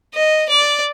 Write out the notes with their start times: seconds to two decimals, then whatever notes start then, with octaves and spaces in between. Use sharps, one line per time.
0.15 D#5
0.49 D5